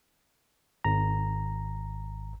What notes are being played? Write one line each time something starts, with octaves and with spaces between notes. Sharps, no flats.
G#1 A#5